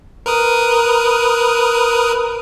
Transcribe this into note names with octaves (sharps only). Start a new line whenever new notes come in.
A#4 B4 D#6